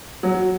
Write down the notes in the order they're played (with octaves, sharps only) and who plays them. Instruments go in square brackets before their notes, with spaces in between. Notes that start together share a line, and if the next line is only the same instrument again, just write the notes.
[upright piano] F#3